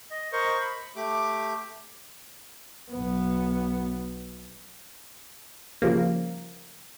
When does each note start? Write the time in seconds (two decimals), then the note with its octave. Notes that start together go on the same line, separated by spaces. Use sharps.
0.11 D#5
0.33 A#4 C5 D#5 C#6
0.60 B5
0.96 A3 G4 D6
2.92 B1 B3
5.82 C#3 F3 G3 A#3